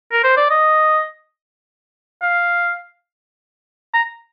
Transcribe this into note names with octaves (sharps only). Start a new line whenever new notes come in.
A#4
C5
D5
D#5
F5
A#5